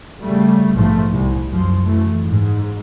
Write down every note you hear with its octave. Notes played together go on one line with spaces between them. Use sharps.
C#3 G3 A3
A#1 G#2 B2 F3 A3
C2
F#2 F3
F#2 E3 A3
G#2